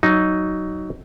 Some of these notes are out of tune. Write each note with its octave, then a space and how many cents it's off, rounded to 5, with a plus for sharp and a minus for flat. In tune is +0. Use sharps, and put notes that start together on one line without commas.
F#3 +15 D#4 +0